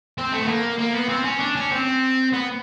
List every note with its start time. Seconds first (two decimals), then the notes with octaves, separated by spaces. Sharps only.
0.18 C4
0.32 A3
0.42 B3
0.48 A#3
0.79 A#3
0.94 B3
1.09 C4
1.25 C#4
1.40 D4
1.56 C#4
1.72 C4
2.33 B3